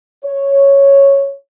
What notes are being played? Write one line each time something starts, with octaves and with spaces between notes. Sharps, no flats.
C#5